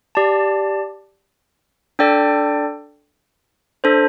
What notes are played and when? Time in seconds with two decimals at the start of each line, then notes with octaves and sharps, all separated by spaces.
0.15 G4 D5 A5
1.99 D4 A4 D5 G5
3.84 D4 A4 C5